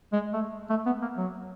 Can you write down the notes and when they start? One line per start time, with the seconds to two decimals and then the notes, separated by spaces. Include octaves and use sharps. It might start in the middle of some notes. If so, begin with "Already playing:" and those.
0.13 G#3
0.34 A3
0.70 A3
0.86 B3
1.02 A#3
1.17 F#3